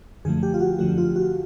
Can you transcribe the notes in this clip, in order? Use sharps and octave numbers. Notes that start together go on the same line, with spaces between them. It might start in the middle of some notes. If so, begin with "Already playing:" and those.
F#2 D3 F3 A3 G#4
G4
F4
F#4
F#2 D3 F3 A3 F#4
F4
F#4